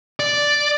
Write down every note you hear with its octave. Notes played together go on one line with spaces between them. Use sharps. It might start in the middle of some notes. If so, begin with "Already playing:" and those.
D5